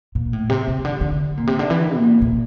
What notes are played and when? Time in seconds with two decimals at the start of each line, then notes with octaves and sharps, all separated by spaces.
0.15 A#2
0.33 A2
0.50 C3
0.68 C3
0.85 D3
1.01 D3
1.37 A#2
1.47 C3
1.59 D3
1.70 E3
1.96 A#2
2.22 A#2